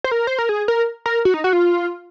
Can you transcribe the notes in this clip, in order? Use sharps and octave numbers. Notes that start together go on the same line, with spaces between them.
C5
A#4
C5
A#4
G#4
A#4
A#4
F#4
D#4
F#4
F4